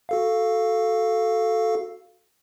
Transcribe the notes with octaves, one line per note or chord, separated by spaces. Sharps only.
F#4 A4 F5